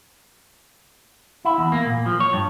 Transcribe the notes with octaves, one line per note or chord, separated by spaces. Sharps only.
E4
E2
A#3
A#2
F3
C#5
G2